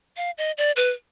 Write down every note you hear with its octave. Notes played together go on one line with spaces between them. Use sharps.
F5
D#5
D5
B4